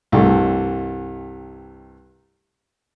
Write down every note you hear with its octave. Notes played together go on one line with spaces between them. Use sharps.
C2 G2 A3